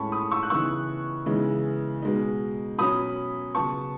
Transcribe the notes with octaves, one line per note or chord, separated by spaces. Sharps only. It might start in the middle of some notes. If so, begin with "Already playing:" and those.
Already playing: A2 G#3 C#4 A5 B5 C#6
B5 D#6
C#6 E6
F#6
C#3 E3 B3 D#4 C#6 E6
C#3 E3 G#3 B3 D#4
B2 G#3 D#4
B2 F#3 C#4 B5 D#6
C#3 F#3 B3 A5 C#6